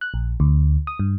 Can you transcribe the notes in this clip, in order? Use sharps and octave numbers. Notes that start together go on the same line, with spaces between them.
F#6
A#1
D2
D#6
G2